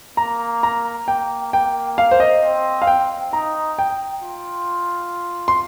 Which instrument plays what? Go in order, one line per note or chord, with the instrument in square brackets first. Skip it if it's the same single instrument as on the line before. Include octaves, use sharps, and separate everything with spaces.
[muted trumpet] A#3 [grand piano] A#5
[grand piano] A#5
[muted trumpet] A#3 [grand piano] G5
[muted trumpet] A#3 [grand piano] G5
[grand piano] F5
C5
D#5
[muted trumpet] C4
[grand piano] F5
G5
[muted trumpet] D#4 [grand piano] A#5
[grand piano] G5
[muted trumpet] F4
[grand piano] C6